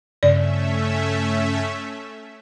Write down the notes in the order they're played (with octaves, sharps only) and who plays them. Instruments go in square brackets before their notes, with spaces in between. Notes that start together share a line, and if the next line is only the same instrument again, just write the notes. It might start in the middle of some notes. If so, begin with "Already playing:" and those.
[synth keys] G2 C#3 [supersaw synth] A3 C#4 E5 [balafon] D5